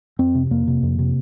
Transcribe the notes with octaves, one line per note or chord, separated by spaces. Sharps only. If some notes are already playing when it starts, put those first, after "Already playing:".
F2 C4
C3
F2 A#3
C3
F2
C3